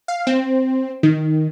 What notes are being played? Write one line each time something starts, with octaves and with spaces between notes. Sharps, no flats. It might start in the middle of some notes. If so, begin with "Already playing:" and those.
F5
C4
D#3